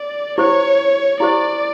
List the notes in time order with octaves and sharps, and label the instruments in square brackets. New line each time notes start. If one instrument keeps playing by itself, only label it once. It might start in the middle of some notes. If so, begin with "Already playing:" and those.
Already playing: [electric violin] D5
[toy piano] E4 G4 C5 [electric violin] C#5
[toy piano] E4 G4 C5 [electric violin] D5